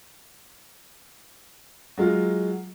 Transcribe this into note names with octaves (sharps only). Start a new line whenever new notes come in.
F#3 G#3 F4